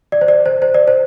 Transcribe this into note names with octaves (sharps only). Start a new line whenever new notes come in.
D5
C5
D5
C5
C5
D5
C5